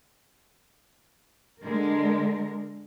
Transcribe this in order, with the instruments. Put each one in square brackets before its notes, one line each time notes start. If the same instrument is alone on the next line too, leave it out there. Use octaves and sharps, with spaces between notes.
[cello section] D3 G#3 A#4